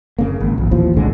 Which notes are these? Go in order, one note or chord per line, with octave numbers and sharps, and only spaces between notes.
F#1 C#3 A#3
G#1
A#1
A1 D#2 F3
B1 A2 D3 G#3